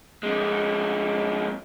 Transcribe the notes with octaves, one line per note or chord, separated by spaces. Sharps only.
F2 G#3